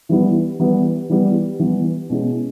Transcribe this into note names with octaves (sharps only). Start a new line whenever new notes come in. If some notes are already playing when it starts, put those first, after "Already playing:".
E3 G3 B3 E4
E3 G3 B3 E4
E3 G3 B3 E4
E3 G3 B3 E4
B2 G#3 C#4 E4